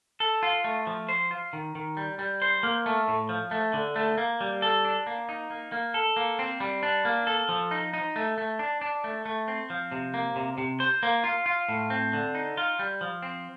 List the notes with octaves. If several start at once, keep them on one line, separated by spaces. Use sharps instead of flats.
A4
F4
A3
F3
C5
F4
D#3
D#3
G3
G3
C5
A#3
A3
A2
F3
A3
D3
A3
A#3
G3
A4
D4
A#3
D#4
A#3
A#3
A4
A#3
C4
G3
D4
A#3
A4
F3
D#4
D#4
A3
A3
D4
D4
A3
A3
C4
F3
C3
A#3
C3
C3
C5
A#3
F4
F4
A2
C4
D3
D#4
F4
G3
F3
C4